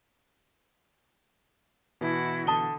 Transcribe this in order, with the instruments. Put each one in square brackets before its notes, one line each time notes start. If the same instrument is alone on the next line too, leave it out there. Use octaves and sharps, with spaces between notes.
[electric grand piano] B2 E3 [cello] E4 F#4
[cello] D3 [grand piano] A5 D#6 G7